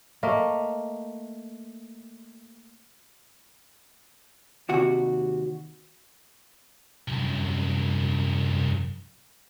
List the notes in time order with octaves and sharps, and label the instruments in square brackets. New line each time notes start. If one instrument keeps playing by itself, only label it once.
[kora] A3 A#3 D#5
[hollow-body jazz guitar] D#2 C3 F#4
[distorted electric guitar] C2 F#2